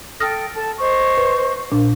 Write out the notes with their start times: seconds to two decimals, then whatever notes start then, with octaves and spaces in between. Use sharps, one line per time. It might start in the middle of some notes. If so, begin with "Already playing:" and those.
0.20 A4 G5 D#6 F6 A#6
0.55 A4 A5
0.79 C5 D#5 C#6
1.17 B4
1.72 A#2 D4